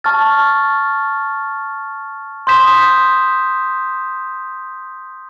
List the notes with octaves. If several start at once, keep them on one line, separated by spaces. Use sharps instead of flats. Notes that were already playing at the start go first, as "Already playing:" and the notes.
A5 C#6 F6 A6
C6 D#6 G6 B6 E7